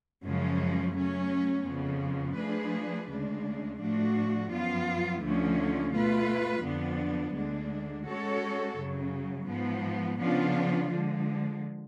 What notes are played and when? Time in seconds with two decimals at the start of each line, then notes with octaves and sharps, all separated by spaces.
0.24 F#2 C#3 F3 G#3 C#4
0.94 F#3 A3 C#4
1.65 F2 C#3 F3 B3
2.37 F3 A3 D4 G#4 B4
3.08 D2 C#3 G#3 D4
3.79 A2 F3 A3 D4 F#4
4.50 F#2 F3 B3 F4
5.22 D2 D3 F3 A3 C#4
5.93 B2 A3 F4 B4
6.63 F2 D3 F3 B3 D4
7.35 D2 D3 G#3 D4
8.06 G#3 C#4 F#4 A4 C#5
8.77 F#2 C#3 F#3
9.48 G#2 F3 B3
10.20 C#3 F3 B3 D4 F4
10.91 D3 F3 G#3